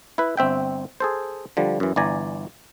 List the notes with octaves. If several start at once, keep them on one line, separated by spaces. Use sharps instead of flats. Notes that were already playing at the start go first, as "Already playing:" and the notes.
E4 B4
G1 C4 E5 G5
G#4 A4 C5
D3 F3 G3
F#2 E3
G1 E3 D5 G#5 A#5